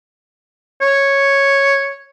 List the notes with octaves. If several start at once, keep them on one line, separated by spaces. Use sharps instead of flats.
C#5